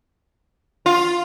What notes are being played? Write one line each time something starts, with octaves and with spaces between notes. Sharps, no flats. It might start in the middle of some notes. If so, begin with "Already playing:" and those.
F4